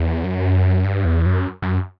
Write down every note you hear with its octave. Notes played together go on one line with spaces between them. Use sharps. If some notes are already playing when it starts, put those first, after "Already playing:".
Already playing: E2
F#2
G2
E2
F#2
F#2